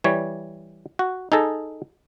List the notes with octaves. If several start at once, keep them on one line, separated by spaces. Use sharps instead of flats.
E3 G3 C#5
F#4
D#4 G#4 A4 A#5